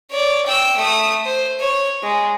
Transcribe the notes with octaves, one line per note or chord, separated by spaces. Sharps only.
C#5 D5
G5 E6
A3 D#6
C5
C#5
G#3